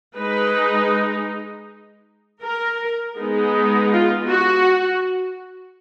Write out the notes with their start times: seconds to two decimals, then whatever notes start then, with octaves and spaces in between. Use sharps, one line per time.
0.17 G#3 D#4 B4
2.43 A#4
3.17 G#3 B3 D#4
3.93 F4
4.30 F#4